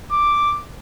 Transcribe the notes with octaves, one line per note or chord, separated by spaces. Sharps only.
D6